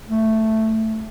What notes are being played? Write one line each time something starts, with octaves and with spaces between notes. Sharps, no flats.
A3